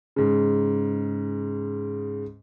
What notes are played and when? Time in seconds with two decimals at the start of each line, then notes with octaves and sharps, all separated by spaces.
0.16 G#2 C#3